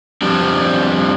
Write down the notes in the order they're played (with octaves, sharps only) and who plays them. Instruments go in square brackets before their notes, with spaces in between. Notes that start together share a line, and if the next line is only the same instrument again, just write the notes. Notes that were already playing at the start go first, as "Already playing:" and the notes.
[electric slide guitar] F2 F3 G3 D4